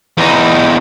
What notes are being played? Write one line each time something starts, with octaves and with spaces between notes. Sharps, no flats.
E2 D#4